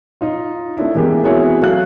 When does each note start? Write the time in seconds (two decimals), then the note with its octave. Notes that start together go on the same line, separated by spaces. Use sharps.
0.21 D#4 F4
0.77 A3 C4 D4 E4
0.95 C3 E3 G#3 A#3 B3 G4
1.24 B3 C4 E4 F#4 G#4 C#5
1.61 F#3 A3 F5 F#6